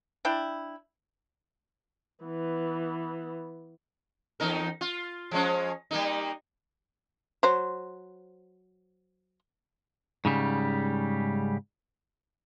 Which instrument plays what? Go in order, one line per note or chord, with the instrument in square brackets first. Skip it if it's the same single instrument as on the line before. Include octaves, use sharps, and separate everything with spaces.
[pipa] D4 E4 G5
[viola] E3 B3
[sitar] E2 D#4 A#4
F4
F3 G#3 C#4
G3 A#3 D#4
[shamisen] F#3 C5
[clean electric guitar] G#2 C#3 G3